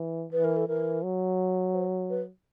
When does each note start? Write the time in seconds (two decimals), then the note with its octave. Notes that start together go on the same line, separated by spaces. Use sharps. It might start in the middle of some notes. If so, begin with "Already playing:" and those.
Already playing: E3
0.33 E3 B4
0.44 A#4
0.56 A4
0.68 E3 A#4
1.03 F#3
1.74 C5
2.10 B4